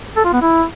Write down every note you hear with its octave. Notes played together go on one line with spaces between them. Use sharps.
A4
F4
B3
E4